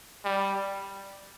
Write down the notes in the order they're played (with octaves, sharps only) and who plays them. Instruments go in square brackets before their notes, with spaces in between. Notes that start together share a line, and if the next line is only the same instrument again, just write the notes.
[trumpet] G3